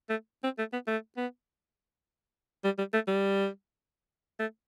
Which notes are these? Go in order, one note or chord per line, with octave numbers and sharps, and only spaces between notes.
A3
C4
A3
B3
A3
B3
G3
G3
A3
G3
A3